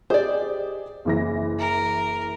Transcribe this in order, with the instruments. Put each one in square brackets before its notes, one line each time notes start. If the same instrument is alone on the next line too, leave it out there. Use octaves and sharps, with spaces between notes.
[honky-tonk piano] G4 G#4 D#5 [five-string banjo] C5 D5
[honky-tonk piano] F#1 E3 A#6
[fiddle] A#4